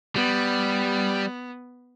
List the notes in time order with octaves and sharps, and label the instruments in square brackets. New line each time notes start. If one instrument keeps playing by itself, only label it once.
[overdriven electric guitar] G3 [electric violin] B3